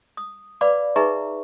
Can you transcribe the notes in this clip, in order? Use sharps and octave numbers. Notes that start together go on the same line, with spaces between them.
D#6
B4 D5 F5 B5 D6
D#4 G#4 B4 E5 A#5 C#6